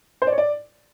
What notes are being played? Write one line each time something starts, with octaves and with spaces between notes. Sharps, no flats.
C5
D5
C#5
D5